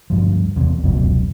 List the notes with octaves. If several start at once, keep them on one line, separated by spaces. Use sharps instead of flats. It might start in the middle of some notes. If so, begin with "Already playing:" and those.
D2 G2 F3
E2 C3
F1 C#2 F#2 B2